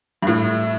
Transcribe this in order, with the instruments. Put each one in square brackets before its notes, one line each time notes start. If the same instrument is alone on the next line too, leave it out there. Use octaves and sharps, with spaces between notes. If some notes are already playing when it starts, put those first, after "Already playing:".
[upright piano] G2
[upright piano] A2 [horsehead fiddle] E5